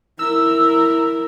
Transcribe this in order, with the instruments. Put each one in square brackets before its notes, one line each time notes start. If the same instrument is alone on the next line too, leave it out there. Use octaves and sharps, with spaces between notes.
[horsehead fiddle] E4 A#4 [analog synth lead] E6